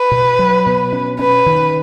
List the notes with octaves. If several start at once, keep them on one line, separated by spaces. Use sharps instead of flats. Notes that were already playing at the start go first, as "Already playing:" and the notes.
Already playing: B4
B2
F#3
B2
C#4
C#4 B4
D#3